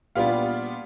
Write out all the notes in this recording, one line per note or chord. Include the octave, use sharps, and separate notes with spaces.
A#2 G3 B3 D4 F4 F5